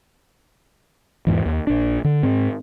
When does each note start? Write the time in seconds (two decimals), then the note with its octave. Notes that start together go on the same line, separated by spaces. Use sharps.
1.27 E2 G#2 E3
1.46 D#2
1.67 A#1 D4
2.04 D3
2.23 G#2 C4